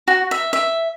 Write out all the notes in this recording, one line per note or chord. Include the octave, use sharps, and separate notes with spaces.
F#4
E5
E5